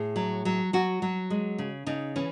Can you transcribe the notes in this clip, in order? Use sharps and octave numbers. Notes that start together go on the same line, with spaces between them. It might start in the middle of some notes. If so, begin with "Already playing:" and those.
Already playing: A2 G#4
F#3
F#3
F#3 F#4
F#3
G#3
C#3
C#3 D#4
E3 C#4